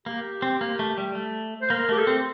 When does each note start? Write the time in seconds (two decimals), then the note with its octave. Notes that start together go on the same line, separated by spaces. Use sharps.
0.06 A#3 G4
0.42 C4
0.61 A#3
0.79 A3
0.98 G3
1.15 A3
1.62 C5
1.70 A#3 A#4
1.89 A3 G4
1.98 A4
2.07 C4